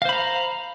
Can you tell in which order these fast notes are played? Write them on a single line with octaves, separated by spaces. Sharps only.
F5 C5 B5 A#5